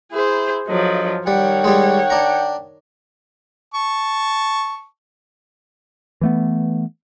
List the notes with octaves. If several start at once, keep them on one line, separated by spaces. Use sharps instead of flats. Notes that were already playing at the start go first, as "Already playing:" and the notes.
E4 G#4 C5
G2 F3 F#3 A4 D#5
D#3 G3 C#5 F#5 G5
G3 G#3
D4 A#5
A5 C#6
E3 A3 B3